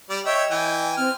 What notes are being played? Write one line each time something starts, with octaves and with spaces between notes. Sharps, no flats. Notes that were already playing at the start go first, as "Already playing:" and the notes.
G3 D5
C#5 D#5 E5 G5
E3 G5 G#5
C4 F6